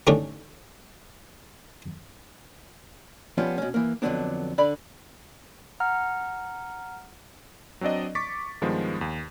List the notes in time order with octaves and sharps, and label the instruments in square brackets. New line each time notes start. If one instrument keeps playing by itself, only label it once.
[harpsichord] D3 E3 A3 C#4 D#4 G4
[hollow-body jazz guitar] F3 G3 B3 C#4 F4
B2 C#4
E3 A#3
F2 G#2 D3 F#3 B3 D4
D3 D5 B5
[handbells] F#5 A#5 F6
[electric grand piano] F#3 C4 D4 D5 D#5
C#6 D6 A6 B6
G2 D#3 F3 G#3 B3
D#2